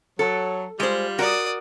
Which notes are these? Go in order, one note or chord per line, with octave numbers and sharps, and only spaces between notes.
F#3 A4
G3 G#3 F4 C5
F#4 A#4 D5 D#6